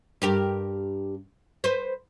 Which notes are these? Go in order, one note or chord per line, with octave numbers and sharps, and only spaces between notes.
G2 G4 A#4
B4 C5